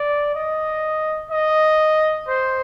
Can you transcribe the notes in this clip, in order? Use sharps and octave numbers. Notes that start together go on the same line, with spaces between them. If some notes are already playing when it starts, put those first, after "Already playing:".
Already playing: D5
D#5
D#5
C5